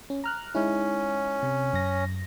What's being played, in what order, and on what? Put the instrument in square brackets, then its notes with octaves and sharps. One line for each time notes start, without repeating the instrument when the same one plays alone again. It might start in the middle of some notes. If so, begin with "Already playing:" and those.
[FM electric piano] C#4
A#5 F6 F#6
[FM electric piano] G#3 D#4 E4 [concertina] C#4
[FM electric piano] C3
F#2 A#6